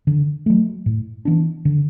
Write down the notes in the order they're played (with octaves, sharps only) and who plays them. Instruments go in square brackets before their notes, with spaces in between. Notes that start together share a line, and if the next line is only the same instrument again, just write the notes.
[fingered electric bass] D3
F#3 A3
A2
E3 B3 D4
D3